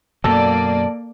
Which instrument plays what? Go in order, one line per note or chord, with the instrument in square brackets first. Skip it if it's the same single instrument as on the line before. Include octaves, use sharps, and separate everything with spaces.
[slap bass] F#2 B2 F#3 [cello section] A#3 D5 [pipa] A4